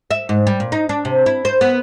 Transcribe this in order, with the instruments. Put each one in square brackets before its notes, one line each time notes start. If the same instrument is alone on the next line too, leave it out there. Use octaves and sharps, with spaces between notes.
[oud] E5
G#2
G3
A#2
D#4
D4
C3
E4
C5
B3